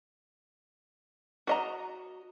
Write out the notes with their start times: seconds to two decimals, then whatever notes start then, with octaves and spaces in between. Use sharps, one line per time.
1.47 F#4 D#5 A#5